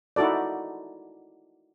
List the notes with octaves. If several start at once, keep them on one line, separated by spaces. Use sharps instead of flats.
D#4 E4 F#4 A4 D5